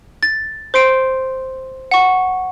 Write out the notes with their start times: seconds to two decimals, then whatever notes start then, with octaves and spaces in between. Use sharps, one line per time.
0.23 A6
0.74 C5 C6 C7 D7
1.91 F#5 C#6